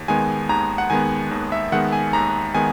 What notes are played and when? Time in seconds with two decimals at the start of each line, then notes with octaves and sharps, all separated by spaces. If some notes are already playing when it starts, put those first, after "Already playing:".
Already playing: D#2
0.08 D#3 G#3 B3 G#5
0.49 D#2 A#5
0.78 F#5
0.90 D#3 G#3 B3 G#5
1.31 D#2
1.52 E5
1.72 D#3 G#3 B3 F#5
1.93 G#5
2.13 D#2 A#5
2.54 D#3 G#3 B3 G#5